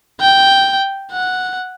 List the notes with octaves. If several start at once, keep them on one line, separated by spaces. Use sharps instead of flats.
G5
F#5